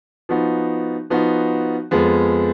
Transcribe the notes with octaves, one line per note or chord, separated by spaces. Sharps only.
F3 B3 D#4 F#4
F3 B3 D#4 F#4
F2 F3 G#3 B3